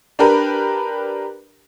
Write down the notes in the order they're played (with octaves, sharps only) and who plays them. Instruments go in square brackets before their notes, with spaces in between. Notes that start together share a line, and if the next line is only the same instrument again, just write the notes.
[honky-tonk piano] D4 G4 A#4 B4